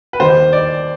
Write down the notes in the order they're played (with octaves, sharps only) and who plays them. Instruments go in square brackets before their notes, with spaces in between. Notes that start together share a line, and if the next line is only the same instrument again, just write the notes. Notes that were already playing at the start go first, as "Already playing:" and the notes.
[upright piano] B4
D#2 D#3 G3 C5
D5